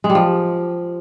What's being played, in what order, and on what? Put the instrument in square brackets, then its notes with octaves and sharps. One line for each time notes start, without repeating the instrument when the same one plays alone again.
[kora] G#3
G3
F3